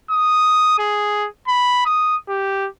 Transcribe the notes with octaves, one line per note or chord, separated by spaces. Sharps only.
D#6
G#4
B5
D#6
G4